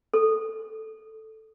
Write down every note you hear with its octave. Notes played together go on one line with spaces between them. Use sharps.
A4